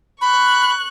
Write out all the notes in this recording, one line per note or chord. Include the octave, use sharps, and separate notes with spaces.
B5 C#6 F#6